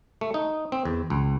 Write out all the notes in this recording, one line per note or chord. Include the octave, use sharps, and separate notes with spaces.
A3
D#4
C4
E2
C#2